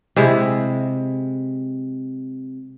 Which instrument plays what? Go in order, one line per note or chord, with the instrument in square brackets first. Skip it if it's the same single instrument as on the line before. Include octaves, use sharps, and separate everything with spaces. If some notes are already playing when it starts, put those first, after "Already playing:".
[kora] C3 G#3 E4